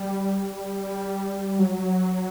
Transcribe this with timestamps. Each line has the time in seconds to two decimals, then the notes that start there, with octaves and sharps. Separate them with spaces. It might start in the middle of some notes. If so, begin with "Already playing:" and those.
Already playing: G3
1.59 F#3